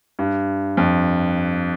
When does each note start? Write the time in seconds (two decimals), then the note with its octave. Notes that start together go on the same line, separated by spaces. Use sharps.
0.19 G2
0.77 F2